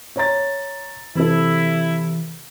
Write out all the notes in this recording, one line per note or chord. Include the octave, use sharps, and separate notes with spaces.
C#5 A#5 A6
C3 E3 E4 A4